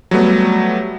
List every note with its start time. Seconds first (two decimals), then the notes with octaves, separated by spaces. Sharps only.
0.11 F#3 G3 A3 B3